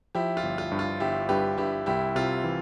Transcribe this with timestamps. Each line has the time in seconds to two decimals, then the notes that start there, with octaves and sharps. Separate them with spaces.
0.15 F3 E4 G4
0.37 F4
0.43 G1
0.58 F4
0.72 G2
0.79 F4
1.00 G1 E4 G4
1.29 G2 G4 B4
1.58 G2 E4 G4
1.86 C2 E4 G4
2.15 C3 F4
2.44 E3